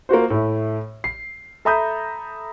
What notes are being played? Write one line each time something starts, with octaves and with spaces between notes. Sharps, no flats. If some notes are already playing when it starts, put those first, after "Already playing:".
A#3 F4 F#4 C5
A2 A3 E4
C7
A4 E5 A#5 B5 D#6 G6